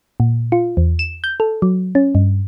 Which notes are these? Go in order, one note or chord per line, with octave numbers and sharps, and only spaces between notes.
A#2
F4
E2
E7
G6
A4
F#3
C#4
G2